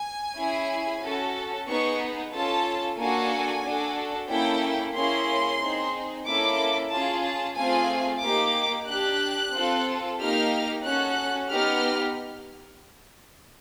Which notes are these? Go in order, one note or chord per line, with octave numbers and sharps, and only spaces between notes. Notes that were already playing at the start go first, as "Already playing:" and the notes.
Already playing: G#5
C#4 E4 G#4
C#4 F#4 A4
B3 D#4 G#4 C#6
C#4 F4 A4 A5
A#3 D4 F#4 A4 G#5
D4 F#4 A4
A#3 C#4 E4 A4 G5
A#3 C#4 E4 G#4 C6
C4 D#4 G#4
A#3 C#4 E4 A4 D6
C#4 F4 G#4 A5
A5
A3 C4 F4 G#4 G#5
A#3 D#4 G4 D6
D4 G4 F#6
C4 F4 A4
A#3 D#4 G4 F6
C#4 F#4 A4 F#6
B3 D#4 G4 F6